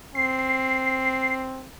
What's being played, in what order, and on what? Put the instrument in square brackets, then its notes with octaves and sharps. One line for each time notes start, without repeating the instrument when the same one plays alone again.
[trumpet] C4 [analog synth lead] C7